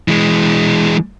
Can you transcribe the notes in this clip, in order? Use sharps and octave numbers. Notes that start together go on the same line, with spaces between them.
E3 G#3